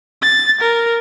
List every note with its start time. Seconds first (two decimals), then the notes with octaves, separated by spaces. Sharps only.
0.22 A6
0.61 A#4